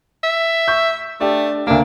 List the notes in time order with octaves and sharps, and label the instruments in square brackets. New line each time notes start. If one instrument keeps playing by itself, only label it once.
[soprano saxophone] E5
[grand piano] C#6 G6
[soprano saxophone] A3 [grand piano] D4 G4
[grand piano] D2 A#3 [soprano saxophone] D4